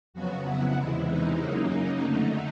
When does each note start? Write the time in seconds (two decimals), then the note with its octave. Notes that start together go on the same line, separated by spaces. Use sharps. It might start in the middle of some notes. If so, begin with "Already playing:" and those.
0.14 F2 C#3 F#3 B3 F#4
0.45 E4
0.76 E2 C3 E3 G#3
1.07 D#4
1.39 F#2 C#3 F#3 A#3 D#4
2.01 F2 D3 F#3 A3